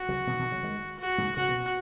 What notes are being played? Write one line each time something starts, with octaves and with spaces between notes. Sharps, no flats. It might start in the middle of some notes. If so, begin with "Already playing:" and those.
Already playing: F#4
C#3 F#3
B2 D#3
B2 D#3
C#3 F#3
D#3 G#3
F#4
G#2 C#3
C#3 F#4
B2